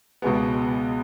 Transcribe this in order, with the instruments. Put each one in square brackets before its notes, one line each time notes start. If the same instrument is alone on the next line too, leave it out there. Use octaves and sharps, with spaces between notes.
[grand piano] C#2 B2 G#3 B3